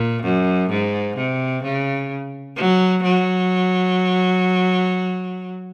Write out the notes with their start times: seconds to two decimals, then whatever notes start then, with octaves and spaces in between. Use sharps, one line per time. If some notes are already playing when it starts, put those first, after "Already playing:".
Already playing: A#2
0.23 F#2
0.70 G#2
1.17 C3
1.64 C#3
2.56 F#3
3.03 F#3